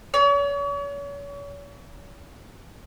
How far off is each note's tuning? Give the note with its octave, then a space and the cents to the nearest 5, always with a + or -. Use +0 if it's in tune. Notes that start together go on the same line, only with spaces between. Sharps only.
C#5 +40